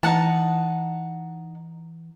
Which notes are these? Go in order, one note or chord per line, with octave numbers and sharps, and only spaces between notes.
E3 D#4 F#5 A5